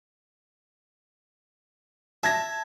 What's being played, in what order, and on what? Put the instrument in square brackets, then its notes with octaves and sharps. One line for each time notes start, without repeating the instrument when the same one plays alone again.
[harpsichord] E5 [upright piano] A5 G#6 A#6